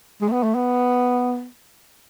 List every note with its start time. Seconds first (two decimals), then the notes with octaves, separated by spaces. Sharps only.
0.21 G#3
0.28 A3
0.32 B3
0.43 A3
0.55 B3